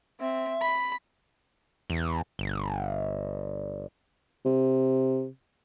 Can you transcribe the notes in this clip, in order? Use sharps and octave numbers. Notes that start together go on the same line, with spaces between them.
C4 E5
B5
E2
G1
C3